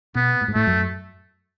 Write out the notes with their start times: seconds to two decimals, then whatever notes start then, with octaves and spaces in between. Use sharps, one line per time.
0.15 B2 B3
0.41 A2
0.48 G#2
0.54 A2 A3
0.67 F#2